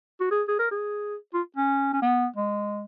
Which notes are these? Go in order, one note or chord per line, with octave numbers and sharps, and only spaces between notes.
F#4
G#4
G#4
A#4
G#4
F4
C#4
C#4
B3
G#3